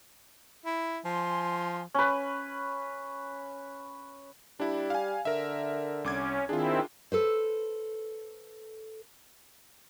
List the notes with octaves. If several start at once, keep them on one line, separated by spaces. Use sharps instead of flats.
E4
F3 G#5 C6
C#4 B4
G3 D4 E4
F5 G#5
D3 A#4 E5
C2 C#4 D6 G#6
D#3 C4 D4 E4 F4 G#4
A4 B4 C5